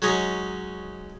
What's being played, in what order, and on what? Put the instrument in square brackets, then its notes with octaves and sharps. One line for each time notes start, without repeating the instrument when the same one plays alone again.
[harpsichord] F#3 G#3 C#4 D#4